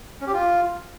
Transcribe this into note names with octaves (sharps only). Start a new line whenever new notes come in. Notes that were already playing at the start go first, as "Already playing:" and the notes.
C#4
G4
F4